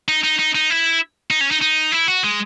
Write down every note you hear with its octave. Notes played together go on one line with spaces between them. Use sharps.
D#4
D#4
D#4
D#4
E4
D#4
C#4
D#4
D#4
E4
F#4
G#3